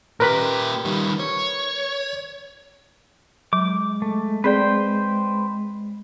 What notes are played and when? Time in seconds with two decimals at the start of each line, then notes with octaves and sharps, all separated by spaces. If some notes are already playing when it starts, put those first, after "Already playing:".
0.20 A#2 G4 A#4 B4 B5
0.85 D#3 G3
1.20 C#5
3.53 F#3 G#3 D6
4.02 A3
4.44 C4 G#4 B4 C5 D5 G5